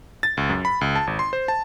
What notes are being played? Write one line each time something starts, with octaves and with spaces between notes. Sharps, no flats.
A6
C#2
F#2
B5
C#2
A5
G#1
C6
C5
A5